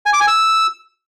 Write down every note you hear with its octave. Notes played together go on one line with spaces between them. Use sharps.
G#5
D6
G#5
E6